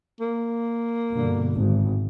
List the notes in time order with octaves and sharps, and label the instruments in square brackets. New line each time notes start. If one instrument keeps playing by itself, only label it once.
[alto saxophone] A#3
[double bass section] G2 B2 D3
G#1